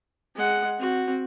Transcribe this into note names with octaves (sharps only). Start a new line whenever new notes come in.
G#3 F#5
C4 F#4